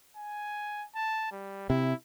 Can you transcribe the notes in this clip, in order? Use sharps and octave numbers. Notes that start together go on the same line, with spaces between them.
G#5
A5
G3
C3 E4